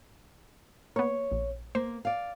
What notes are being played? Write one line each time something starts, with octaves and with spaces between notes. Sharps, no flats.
A#3 B3 C#5
A#1
A#3 C5
D5 F5